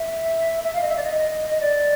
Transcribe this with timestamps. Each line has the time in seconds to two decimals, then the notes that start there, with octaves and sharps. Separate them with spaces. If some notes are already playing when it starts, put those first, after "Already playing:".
Already playing: E5
0.64 E5
0.74 F5
0.81 D#5
0.88 E5
0.96 D5
1.03 D#5
1.49 D#5
1.60 D5